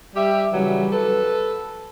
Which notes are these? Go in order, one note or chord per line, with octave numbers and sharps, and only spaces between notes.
G3 G4 E5
C#3 E3 F#3 G3
A4 B4